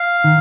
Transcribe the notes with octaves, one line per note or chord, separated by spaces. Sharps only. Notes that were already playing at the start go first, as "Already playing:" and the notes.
Already playing: F5
D#3